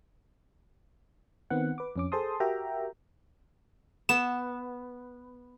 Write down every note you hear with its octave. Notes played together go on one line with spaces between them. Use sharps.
D#3 B3 C4 F#5
B4 D6
F2 C#4 D6
G#4 A4 C5 A5 C6 D#6
F#4 G4 A#4 E5 G5 A#5
B3 E7